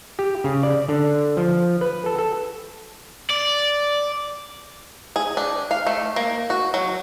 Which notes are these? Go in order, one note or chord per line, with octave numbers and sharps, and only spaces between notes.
G4
C#3
D5
D3
F3
B4
A4
A4
D5
G#4
D4
F5
A3
A#3
F#4
F#3